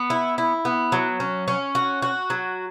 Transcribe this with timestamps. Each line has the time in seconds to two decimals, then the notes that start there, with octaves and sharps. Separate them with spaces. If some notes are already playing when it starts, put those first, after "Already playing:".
Already playing: B3
0.10 E4
0.38 E4
0.65 B3
0.92 F#3
1.20 C#4
1.48 C#4
1.75 F#4
2.02 F#4
2.30 F#3